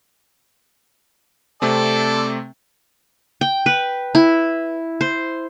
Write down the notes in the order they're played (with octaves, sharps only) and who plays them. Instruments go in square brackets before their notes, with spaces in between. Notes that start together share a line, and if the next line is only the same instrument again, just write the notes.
[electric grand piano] C3 A3 C4 [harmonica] A4 D5
[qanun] G5
B4
E4
C5